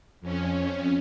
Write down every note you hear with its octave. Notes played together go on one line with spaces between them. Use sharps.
F2 C#4